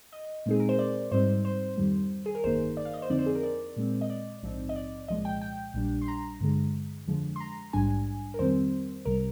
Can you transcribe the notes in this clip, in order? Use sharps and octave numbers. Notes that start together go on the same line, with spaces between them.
D#5
A#2 G#3 C4 D#4 G#4
A#4
C5
D5
G#2 G3 C4 D#4 C5
C5
F2 D#3 G3
G#4
A#4
G1 F2 D#3 A#3 D#4 C5
D5
F5
D#5
C5
F2 D3 F3 C4 D#4 D5
C5
G#4
A#4
D5
A#2 G#3 C4
D#5
D5
A#1 G#2 F3 C4 D#4
D#5
D5
C2 A#2 F3 G#3 D#5
G5
G5
A#1 A#2 G3 D4
C6
A#5
G2 D3 G#3
F2 D3 F3 G#3
C6
A#5
A#1 G#2 G3 D4 G#5
A#4
F2 D#3 G3 C4 C5
C2 C3 G3 A#4